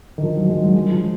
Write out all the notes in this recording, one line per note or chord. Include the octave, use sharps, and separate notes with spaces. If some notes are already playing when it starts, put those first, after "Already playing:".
D#3
F3
F#3
G#3
F#3
G#3
F3